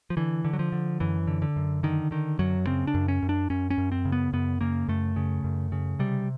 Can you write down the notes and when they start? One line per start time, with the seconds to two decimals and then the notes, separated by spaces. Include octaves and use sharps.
0.10 F3
0.17 D3 E3
0.44 D3
0.53 F#3
0.59 F3
0.72 D3
1.00 F#2 E3
1.27 D3
1.42 D3
1.56 F#2
1.83 D3 D#3
2.11 D3 D#3
2.39 F#2 F#3
2.67 C#3 C4
2.87 D4
2.94 F#2
3.08 C#4
3.22 F#2
3.29 D4
3.50 F#2 C#4
3.70 C#4
3.78 F#2
3.92 C4
4.05 C#3
4.12 B3
4.33 F#2 B3
4.61 C#3 A#3
4.88 F#2 A3
5.16 C#3
5.44 F#2
5.72 C#3
5.99 C3 G3